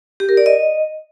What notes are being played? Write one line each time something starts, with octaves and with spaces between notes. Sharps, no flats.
G4
A#4
D5
D#5